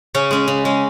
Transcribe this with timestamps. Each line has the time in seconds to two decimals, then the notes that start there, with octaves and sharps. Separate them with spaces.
0.14 C#3 C#4
0.31 G#3 C#4
0.48 C#3
0.65 G#3 C#4